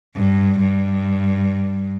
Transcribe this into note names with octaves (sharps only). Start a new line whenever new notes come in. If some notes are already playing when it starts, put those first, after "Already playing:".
G2
G2